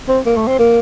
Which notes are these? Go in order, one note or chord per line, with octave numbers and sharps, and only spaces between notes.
C4
A#3
A3
C4
A#3